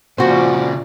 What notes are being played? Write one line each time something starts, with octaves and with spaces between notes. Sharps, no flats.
A#2 C#3 F3 F#4 C5 D5